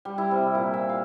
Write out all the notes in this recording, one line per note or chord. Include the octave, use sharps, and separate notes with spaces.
G3
E4
C3
A#2
E5
F5